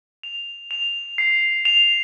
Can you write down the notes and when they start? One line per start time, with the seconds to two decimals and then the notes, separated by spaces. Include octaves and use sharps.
0.23 F7
0.71 F7
1.18 C7
1.65 F7